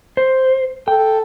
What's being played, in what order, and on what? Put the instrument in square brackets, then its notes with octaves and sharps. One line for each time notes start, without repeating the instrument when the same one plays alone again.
[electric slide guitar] C5
[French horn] A4 [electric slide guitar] G5